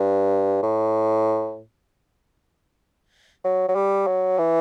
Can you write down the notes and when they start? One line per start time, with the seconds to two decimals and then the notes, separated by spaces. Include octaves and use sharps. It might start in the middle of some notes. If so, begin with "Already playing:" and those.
Already playing: G2
0.63 A2
3.44 F#3
3.68 F#3
3.75 G3
4.07 F#3
4.38 E3